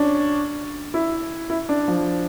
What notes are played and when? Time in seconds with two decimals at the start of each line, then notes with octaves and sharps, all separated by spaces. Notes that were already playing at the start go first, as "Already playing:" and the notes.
Already playing: C#4 D4
0.94 E4
1.50 E4
1.69 D4
1.88 F3